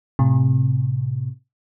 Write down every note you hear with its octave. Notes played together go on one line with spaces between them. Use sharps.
A2 C3